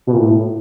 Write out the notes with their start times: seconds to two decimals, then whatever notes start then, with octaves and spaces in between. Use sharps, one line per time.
0.07 B2
0.13 A#2
0.19 A2